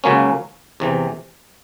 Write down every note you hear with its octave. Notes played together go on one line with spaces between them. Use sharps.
C#2 C#3 F#3 A#3 C#4
E2 C3 E3